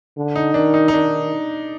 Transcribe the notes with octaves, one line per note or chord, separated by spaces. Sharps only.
D3
D#4
D#3 D4
D#4
D#4
D#3 D4